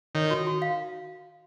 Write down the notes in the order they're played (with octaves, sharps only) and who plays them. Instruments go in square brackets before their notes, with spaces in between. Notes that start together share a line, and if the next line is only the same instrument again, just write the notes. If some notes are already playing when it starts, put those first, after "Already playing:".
[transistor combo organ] D#3 [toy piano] C#5
[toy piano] F#4
F#4
F5